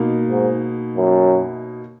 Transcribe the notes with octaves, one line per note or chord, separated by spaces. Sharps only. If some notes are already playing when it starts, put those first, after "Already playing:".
Already playing: B2 A#3 D#4
G#2
F#2